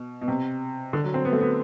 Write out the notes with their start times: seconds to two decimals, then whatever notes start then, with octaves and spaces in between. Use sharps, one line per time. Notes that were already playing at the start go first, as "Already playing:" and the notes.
Already playing: B2
0.21 B2
0.28 C3
0.93 D3
1.04 F#3
1.14 C4
1.25 B3
1.33 A3
1.41 B3